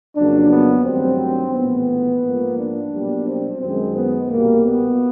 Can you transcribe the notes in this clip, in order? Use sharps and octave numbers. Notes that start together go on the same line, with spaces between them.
F2 C#3 F#3 A#3 D4
B3
G2 D#3 F#3 A3 C4
A#1 A2 E3 B3
G#2 F3 A#3
D4
B1 B2 G3 A#3
C4
F#2 D#3 G#3 C4
B3
C2 B2 G3 A#3
B3